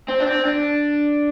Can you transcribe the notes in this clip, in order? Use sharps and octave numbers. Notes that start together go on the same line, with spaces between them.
C4
D4
C4
D4